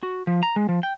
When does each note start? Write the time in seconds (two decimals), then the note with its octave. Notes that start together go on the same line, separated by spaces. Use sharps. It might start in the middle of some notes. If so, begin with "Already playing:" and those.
0.03 F#4
0.27 F3
0.43 A#5
0.56 G#3
0.69 F3
0.83 G5